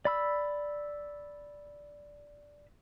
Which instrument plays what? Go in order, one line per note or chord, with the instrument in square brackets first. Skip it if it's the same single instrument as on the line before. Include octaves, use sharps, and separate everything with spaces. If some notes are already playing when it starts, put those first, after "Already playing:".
[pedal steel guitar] D5 B5 E6